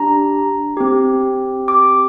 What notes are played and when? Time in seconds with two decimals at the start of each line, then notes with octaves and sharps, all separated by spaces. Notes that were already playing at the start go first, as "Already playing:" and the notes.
Already playing: D4 G4 A#5
0.77 C4 G4
1.68 D6